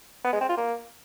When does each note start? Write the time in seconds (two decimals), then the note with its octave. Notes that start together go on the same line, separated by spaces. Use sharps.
0.25 B3
0.33 G#3
0.41 C4
0.49 F4
0.58 A#3